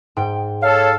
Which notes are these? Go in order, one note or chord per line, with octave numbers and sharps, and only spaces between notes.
G#2 G5
A4 C#5 F5